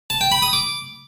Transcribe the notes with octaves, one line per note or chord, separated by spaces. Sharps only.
A5
G5
B5
D#6
D6